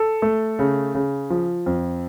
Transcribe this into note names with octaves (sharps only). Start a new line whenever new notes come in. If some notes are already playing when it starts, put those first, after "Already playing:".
Already playing: A4
A3
C#3
C#3
F3
F2